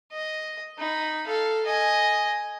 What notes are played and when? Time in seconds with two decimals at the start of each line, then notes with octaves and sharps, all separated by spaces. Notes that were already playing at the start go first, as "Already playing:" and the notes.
0.12 D#5
0.77 D#4 B5
1.27 A4 F5
1.66 D#5 G#5